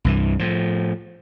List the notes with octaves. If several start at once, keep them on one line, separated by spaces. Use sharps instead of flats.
C2 G2 E3
A2 F3